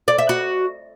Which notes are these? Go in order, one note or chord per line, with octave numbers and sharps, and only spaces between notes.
D5
E5
F#4